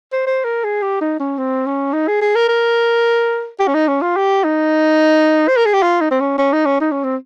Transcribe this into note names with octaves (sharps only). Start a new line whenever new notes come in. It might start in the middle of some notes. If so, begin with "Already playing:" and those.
C5
C5
A#4
G#4
G4
D#4
C#4
C4
C#4
D#4
G#4
G#4
A#4
A#4
G4
C#4
D#4
C#4
F4
G4
D#4
C5
A#4
G#4
G4
F4
D#4
C4
C#4
C#4
D#4
C#4
D#4
C#4
C4